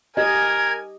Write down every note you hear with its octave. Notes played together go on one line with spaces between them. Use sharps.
G4 A#4 D#5 G#5 G#6